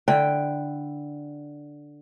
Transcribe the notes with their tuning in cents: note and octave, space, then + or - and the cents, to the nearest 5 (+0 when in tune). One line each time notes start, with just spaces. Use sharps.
D3 +0 E4 +5 G5 +0